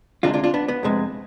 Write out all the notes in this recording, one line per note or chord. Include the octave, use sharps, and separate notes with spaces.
D2 C3 G#3 D4 F4
D4 F4
D4 F4
B3 D4
B3
F2 C3 G#3